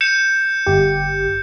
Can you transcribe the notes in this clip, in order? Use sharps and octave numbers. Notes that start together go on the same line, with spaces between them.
G6 C#7 E7
G1 G4